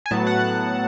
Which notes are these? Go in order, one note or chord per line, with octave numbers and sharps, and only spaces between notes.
G#5
A2 F#3 B3 A5
F#5